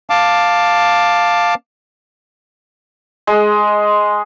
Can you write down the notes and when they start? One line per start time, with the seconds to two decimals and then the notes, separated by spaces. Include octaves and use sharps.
0.10 F5 A5 D6
3.27 G#3